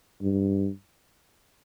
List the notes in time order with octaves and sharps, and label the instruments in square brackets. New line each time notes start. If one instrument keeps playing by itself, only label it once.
[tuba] G2